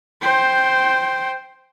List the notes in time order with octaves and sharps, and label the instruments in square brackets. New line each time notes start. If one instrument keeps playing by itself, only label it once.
[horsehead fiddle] C5 G5